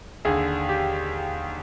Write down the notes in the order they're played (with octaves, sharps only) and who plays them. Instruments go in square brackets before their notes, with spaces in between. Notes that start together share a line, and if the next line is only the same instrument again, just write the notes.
[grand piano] D#2 D3 G#4
G4